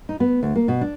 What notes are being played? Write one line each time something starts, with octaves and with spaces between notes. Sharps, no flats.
D#4
B3
D2
A#3
B2
D4